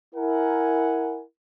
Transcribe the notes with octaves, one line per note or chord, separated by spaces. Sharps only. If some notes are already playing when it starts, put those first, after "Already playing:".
E4 A#4 F#5 G#5